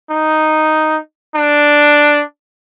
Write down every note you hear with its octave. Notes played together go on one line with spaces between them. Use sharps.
D#4
D4